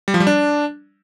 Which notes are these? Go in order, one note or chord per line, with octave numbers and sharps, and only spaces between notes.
G3
F3
G3
D4